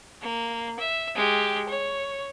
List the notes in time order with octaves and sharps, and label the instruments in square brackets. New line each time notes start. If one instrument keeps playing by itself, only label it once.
[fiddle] A#3
E5
G#3 G4
C#5